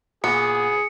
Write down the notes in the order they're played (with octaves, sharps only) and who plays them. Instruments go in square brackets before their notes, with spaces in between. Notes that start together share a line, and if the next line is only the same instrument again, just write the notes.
[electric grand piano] A#2 F#4 [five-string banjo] B3 [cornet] G#4 [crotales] C#7